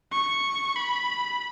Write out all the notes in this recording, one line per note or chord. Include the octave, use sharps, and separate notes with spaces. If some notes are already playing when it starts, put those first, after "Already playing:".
C#6
B5